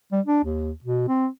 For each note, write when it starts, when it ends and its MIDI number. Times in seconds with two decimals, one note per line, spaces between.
0.12 0.21 55
0.26 0.40 62
0.44 0.71 39
0.84 1.05 47
1.08 1.28 60